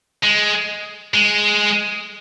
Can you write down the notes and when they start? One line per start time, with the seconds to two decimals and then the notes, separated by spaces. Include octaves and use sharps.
0.23 G#3
1.14 G#3